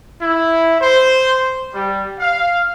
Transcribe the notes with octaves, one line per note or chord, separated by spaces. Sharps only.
E4
C5
G3
F5